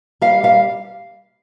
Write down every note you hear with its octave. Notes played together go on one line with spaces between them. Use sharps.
G3 F5
G3 F5